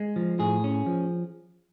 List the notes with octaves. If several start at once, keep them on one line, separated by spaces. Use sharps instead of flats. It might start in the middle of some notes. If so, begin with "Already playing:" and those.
Already playing: G#3
F3
A2 G#4
C#4
F3